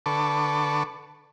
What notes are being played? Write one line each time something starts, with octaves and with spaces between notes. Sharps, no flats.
D3 A4 B4 A5 C#6 D6